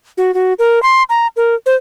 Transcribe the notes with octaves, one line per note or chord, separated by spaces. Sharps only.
F#4
F#4
A#4
C6
A#5
A#4
C5